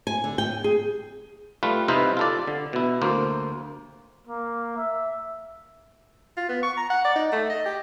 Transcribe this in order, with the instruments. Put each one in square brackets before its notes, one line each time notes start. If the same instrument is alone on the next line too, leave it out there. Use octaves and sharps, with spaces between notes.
[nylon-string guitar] G#5
D3
G5
G#4
[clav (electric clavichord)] G3 A3 F4 B4
C3 D#4 E4 B4 C5 F5
F4 A4 D5
D3
B2 E4
D2 A#3 C5
[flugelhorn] A#3
E5
[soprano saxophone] F4
B3
C#6
A#5
F#5
D5
D#4
A3
D#5
G4